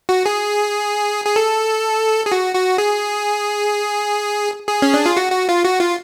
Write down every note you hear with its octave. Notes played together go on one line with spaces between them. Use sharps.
F#4
G#4
G#4
A4
G#4
F#4
F#4
G#4
G#4
C#4
D4
F4
F#4
F#4
F4
F#4
F4